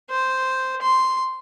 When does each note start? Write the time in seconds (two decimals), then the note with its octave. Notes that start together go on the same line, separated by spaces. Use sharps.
0.10 C5
0.82 C6